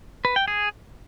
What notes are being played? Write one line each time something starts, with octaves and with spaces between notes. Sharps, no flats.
B4
G5
G#4